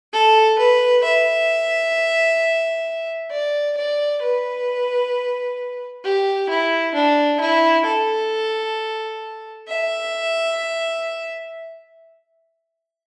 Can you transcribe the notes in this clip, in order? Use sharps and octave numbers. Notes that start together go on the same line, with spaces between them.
A4
B4
E5
D5
D5
B4
G4
E4
D4
E4
A4
E5